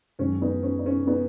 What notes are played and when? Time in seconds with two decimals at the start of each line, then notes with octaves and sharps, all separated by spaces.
0.19 F#2 D#3 G#3 C#4
0.41 B3 D#4
0.63 C#4
0.79 D#4
0.86 C#4
1.07 B3 D#4